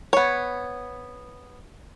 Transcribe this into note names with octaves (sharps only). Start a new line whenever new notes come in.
B3 C#5